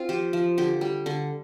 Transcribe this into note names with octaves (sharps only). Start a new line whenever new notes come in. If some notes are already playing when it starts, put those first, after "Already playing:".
Already playing: C4 F4
F3 G4
F3
D3 G4
G3
D3